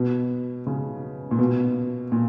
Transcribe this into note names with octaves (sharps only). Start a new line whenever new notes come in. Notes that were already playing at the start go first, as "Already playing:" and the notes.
Already playing: B2
C#3
A#2
B2
A#2